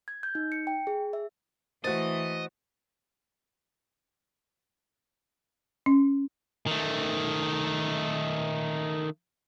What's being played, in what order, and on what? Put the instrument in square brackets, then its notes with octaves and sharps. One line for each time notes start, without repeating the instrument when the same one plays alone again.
[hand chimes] G#6
G6
D#4
C#7
G5
G#4
E5
[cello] E3 A3 [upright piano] F#4 A6 [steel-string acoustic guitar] C5 [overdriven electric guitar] D#5
[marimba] C#4
[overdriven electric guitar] D#3 A3